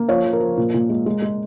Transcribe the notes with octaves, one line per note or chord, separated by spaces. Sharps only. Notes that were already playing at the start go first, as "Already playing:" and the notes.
Already playing: A#3
F3 C#5 F5
F3
A#4
F3
A#2
A#2
G#3
G#3
G#3